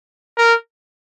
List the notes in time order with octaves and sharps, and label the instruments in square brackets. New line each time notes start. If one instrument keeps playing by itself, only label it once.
[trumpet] A#4